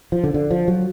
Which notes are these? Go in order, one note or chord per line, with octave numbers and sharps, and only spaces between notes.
F3
D3
D3
F3
F#3